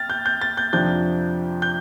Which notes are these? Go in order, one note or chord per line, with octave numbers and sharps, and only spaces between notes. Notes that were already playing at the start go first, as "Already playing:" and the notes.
Already playing: G5 F6 A6
G6
G6
A6
G6
F2 C3 F3 D4 G6
G6